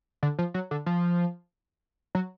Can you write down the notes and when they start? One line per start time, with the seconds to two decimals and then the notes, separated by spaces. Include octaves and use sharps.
0.23 D3
0.39 F3
0.54 F#3
0.71 D3
0.86 F3
2.15 F#3